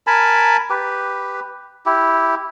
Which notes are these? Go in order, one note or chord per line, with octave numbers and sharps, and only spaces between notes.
A#4 G#5 A5 B5
G4 B4
E4 G4